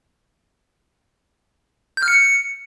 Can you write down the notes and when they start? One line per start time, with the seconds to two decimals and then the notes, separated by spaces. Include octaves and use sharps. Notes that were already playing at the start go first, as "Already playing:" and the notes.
1.97 G6
2.03 F6
2.08 C#7